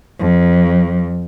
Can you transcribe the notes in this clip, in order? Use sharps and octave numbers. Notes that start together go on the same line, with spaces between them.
F2